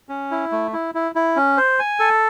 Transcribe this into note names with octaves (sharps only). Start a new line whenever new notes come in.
C#4
E4
A3
E4
E4
E4
C#4
C5
G#5
A4